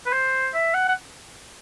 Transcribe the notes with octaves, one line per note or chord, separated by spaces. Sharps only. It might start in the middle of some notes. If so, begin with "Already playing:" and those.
B4
C5
E5
F#5
F#5